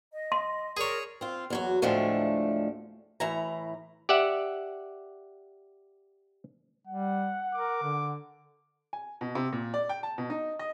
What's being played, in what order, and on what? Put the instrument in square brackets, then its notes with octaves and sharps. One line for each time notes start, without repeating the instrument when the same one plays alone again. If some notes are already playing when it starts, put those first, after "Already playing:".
[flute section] D#5
[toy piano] C6
[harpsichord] G#4 C#5 [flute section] A#4 D5
[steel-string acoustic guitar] C4 F4
E2 F#3 F#4
D2 A2 F3 G#3 A3 D4
A2 E3 E4 A#5
[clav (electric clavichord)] G4 D5 E5 F#5
[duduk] G3 [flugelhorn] F#5
[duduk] A#4 [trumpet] D6
[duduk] D3
[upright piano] G#5
B2
C3
A#2
D5
G5
A5
B2
D#4
D#5